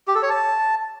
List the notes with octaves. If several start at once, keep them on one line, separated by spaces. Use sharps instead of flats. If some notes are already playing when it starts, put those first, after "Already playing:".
G4
A4
C#5
A5